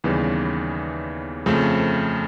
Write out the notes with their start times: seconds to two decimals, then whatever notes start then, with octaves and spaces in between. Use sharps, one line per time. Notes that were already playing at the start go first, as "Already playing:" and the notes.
0.04 D#2 C#3 E3 G3 B3
1.46 F2 C#3 F3 A3